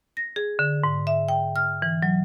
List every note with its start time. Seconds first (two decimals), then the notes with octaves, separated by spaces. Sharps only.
0.17 A#6
0.36 G#4
0.59 D3
0.83 G#2
1.07 E5
1.29 G5
1.56 F6
1.82 E3
2.02 F#3